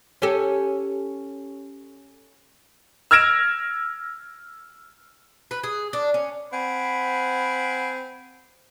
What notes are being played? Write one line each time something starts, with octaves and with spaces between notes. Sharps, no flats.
C#4 G4 A4
E6 F6 G#6 A#6 D7 E7
B4
G#4
D4
C#4
C4 F#5 G#5 B5